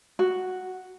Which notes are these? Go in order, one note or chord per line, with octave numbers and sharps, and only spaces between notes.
F#4